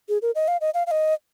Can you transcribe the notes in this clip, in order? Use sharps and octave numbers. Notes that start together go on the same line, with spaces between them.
G#4
A#4
D#5
F5
D#5
F5
F5
D#5